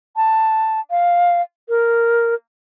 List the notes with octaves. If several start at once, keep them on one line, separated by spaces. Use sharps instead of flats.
A5
F5
A#4